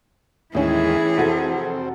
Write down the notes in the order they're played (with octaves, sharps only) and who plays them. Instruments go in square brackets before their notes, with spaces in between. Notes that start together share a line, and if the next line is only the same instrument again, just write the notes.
[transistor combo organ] D#2 G#3 [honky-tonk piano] A2 C#4 [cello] E3 G#4 [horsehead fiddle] E4
[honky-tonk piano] F1 F#4 A4 [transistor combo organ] C4